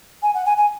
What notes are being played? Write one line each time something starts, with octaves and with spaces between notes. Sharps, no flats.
G#5
F#5
G#5
G#5